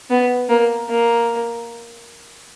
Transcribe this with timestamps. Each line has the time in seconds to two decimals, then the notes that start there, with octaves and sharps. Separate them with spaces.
0.10 B3
0.49 A#3
0.90 A#3